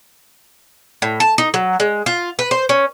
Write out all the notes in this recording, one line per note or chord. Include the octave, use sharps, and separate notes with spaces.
A2
A5
D#4
F#3
G#3
F4
B4
C5
C#4